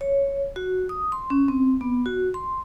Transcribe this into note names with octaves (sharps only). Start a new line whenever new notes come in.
C#5
F#4
D#6
C6
C#4
C4
B3
F#4
C6